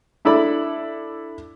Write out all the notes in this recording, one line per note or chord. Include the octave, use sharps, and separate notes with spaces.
D4 E4 A4 D5 B5